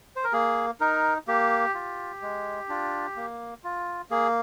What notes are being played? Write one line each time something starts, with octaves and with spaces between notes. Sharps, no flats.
C5
A#4
A#3 G#4
D#4 A#4
A#3 G4
F4
G#3
D4 F4
A#3
F4
A#3 G#4